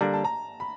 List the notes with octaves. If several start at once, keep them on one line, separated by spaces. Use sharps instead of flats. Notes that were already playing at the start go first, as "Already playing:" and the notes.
D3 G3 A#3 D4 A#5
A5
A#5
B5